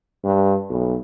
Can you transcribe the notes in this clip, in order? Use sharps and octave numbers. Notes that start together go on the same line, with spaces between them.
G2
B1